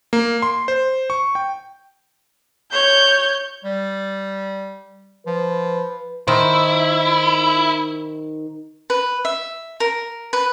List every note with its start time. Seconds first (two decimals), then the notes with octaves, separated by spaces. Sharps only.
0.13 A#3
0.42 C6
0.68 C5
1.10 C#6
1.35 G5
2.72 C#5 G6
3.64 G3
5.27 F3 B4
6.28 D#3 E4 C5
8.90 B4
9.25 E5
9.80 A#4
10.33 B4